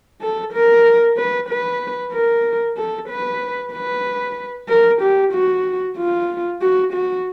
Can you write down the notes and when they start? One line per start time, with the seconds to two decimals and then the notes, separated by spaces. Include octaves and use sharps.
0.21 A4
0.53 A#4
1.17 B4
1.49 B4
2.13 A#4
2.77 A4
3.09 B4
3.73 B4
4.69 A#4
5.01 G4
5.33 F#4
5.97 F4
6.61 F#4
6.93 F#4